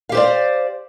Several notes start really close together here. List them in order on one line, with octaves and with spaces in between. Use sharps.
F5 G4 C5 D5